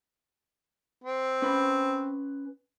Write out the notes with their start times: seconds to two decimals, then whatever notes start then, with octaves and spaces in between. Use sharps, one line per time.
1.04 C4
1.42 C#4 B4 B5